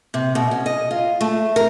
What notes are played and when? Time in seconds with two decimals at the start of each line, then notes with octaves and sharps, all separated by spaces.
0.14 C3
0.35 B2
0.51 C#4
0.66 D#5
0.91 F4
1.21 A3
1.56 A#4